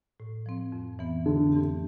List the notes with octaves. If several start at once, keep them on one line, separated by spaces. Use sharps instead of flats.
A2
F3 C4
F2
E3 B3
F2 D3
E3 A3 C4 G4